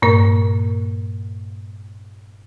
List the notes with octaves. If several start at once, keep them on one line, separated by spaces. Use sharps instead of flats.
G2 A#2 A#3 A#4